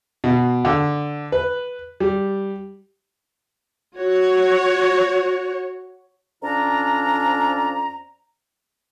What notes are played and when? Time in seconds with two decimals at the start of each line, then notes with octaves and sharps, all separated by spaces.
0.24 B2
0.65 D3
1.32 B4
2.00 G3
3.98 F#4 C#5
6.43 F2 C#4 D4 D5 A#5